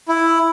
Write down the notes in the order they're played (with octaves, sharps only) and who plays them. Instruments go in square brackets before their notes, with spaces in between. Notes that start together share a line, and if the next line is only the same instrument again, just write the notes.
[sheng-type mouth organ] E4